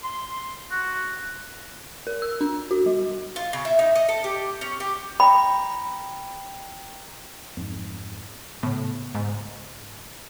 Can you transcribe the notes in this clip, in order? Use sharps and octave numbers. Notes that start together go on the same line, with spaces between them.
C6
F#4
A#4
E6
D4
F#4
G3
F4
C#3
E5
D#4
D#5
A4
G4
C#4
G4
G5 A#5 B5
F2 G#2
A2 C#3 B3
G#2